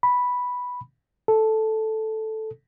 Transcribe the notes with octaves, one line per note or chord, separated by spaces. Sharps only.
B5
A4